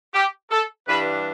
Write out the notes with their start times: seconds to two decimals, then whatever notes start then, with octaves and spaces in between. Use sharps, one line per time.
0.13 G4
0.50 A4
0.87 G2 E3 G3 D4 B4